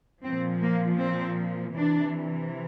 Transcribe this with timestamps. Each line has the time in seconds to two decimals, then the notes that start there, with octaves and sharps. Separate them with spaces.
0.23 A#2 F3 C4
0.61 A#3
1.00 C4
1.76 C3 E3 D4